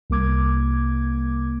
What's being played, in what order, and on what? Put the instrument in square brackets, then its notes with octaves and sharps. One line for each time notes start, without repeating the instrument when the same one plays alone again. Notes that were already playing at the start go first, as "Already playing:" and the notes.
[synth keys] C2 A#3 D6 G#6